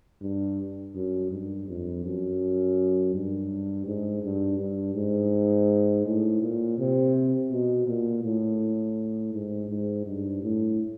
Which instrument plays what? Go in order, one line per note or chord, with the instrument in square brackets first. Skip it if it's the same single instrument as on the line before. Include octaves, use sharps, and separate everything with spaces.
[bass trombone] G2
F#2
G2
F2
F#2
G2
G#2
G2
G2
G#2
A2
A#2
C3
B2
A#2
A2
G#2
G#2
G2
A2